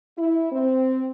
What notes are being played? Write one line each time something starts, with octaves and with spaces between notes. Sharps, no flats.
E4
C4